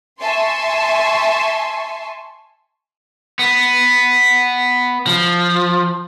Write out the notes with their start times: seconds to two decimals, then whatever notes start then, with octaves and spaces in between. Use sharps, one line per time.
0.20 E5 G#5 A5 C6 C#6
3.39 B3
5.07 F3